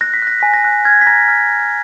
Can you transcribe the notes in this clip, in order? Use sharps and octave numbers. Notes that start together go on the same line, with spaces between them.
F#6 A#6
B6
F#6 A#6
G#5 B6
A#6
F#6
F6 G#6
B6
A#5 A#6
F6